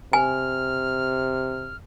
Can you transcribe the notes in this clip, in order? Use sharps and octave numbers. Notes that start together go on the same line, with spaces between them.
C3 G#5 F6